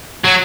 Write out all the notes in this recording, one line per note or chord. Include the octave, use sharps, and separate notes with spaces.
F#3